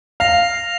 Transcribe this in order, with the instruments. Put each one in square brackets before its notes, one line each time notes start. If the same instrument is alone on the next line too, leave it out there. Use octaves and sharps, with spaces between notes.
[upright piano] F5 [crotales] A#6 F7